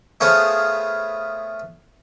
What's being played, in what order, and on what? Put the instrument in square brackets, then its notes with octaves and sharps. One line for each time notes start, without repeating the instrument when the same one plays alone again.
[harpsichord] A3 B3 G#4 C5 C#5 F5